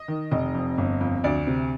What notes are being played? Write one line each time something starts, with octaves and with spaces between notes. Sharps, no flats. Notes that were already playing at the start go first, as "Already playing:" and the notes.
Already playing: D#5
D#3
F1 D#5
F2
G1
F2
D2 D5
C3